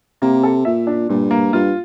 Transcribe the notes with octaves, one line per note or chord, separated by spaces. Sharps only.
C3 A#3
A4
A#2 E5
D4
G2 A#2
A#3
G2 F4